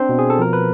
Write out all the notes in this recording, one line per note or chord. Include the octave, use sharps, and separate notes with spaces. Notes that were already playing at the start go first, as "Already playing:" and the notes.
Already playing: C4 D4 C5
B2
G#4
A4
F3 A#4
B4